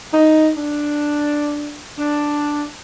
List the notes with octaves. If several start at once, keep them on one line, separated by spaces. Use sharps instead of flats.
D#4
D4
D4